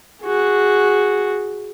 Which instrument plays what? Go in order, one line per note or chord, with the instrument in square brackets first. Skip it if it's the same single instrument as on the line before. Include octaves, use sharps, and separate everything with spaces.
[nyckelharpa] F#4 G#4